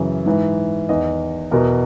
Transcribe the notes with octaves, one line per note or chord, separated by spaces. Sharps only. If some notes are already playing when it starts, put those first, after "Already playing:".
Already playing: F#2 C#3 E3
G#2 E3
E2 D#3 D#5
E2 B2 A#4